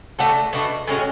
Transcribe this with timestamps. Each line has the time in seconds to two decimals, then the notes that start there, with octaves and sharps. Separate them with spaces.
0.19 A3 D4 F#4 A4
0.53 B2 A3 D4 F#4
0.87 A2 G#3 C#4 F#4